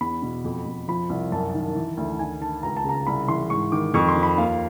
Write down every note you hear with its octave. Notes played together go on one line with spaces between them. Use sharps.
E2 B5
B2
F2
F2
F3 B5
C2
F#2 A5
D#3
E3
D2
D#3 G#5
D#3 A5
C#2 A#5
A5
C#3 A#5
C2 B5
E3 C6
G#2 C#6
D#3 D6
F2 C#6
C6
F3
B5
D#2 F5